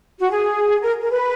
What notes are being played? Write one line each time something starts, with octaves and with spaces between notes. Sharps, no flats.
F#4
G#4
A#4
A#4
B4